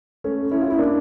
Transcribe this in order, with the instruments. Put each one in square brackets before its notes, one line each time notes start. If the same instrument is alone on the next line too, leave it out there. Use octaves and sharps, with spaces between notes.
[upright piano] A3 C#4
C#4 E4
F4
E4
A#3 D4